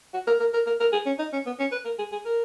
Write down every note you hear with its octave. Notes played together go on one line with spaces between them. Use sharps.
F#4
A#4
A#4
A#4
A#4
A#4
G#4
C#4
D#4
C#4
B3
C#4
B4
A#4
G#4
G#4
A#4